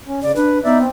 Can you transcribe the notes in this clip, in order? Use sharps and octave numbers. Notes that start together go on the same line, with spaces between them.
C#4
C#3 D5
D4 B4
B3 D#4 D5 E5
C4